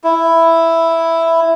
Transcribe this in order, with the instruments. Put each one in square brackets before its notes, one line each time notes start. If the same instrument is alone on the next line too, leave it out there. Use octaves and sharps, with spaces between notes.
[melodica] E4